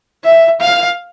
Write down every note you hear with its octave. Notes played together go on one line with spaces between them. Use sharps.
E5
F5